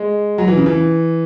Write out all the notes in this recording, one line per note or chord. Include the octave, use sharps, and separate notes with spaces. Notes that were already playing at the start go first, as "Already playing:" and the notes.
Already playing: G#3
F#3
E3
C#3
E3